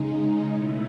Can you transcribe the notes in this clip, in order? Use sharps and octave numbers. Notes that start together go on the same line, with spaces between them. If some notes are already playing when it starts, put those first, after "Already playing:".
Already playing: C#3 G#3 D#4
B2 A3 E4